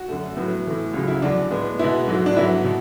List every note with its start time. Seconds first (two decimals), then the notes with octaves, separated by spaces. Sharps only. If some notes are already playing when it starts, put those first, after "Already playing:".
Already playing: F#4
0.08 F#2 D3 A3
0.37 A2 F#3 B3
0.66 A2 E3 A3
0.94 C#2 C#3 F#3
1.08 E4
1.22 E2 D3 F#3 D4
1.51 A2 G#3 B3
1.79 B2 G#3 B3 E4
2.07 G#2 F#3 A3
2.26 D4
2.36 G#2 F#3 B3 E4
2.64 B2